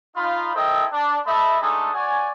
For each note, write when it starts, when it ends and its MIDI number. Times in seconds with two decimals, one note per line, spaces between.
0.16 0.53 63
0.16 0.53 65
0.16 0.53 83
0.54 0.85 64
0.54 0.85 69
0.54 0.85 70
0.54 0.85 72
0.54 0.85 75
0.54 0.85 79
0.92 1.18 62
1.26 1.59 57
1.26 1.59 75
1.26 1.59 76
1.26 1.59 81
1.26 1.59 83
1.61 1.93 56
1.61 1.93 57
1.61 1.93 62
1.61 1.93 63
1.61 1.93 69
1.61 1.93 87
1.93 2.29 66
1.93 2.29 73
1.93 2.29 74
1.93 2.29 80